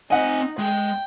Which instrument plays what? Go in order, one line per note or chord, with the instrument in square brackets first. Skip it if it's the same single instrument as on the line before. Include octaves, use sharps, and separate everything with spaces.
[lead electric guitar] C4 G#5 [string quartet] D#4 [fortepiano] D#5 F#5
[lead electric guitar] G#3 [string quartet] G5